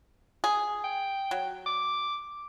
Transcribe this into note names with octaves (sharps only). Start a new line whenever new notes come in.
G#4
G5
F#3
D6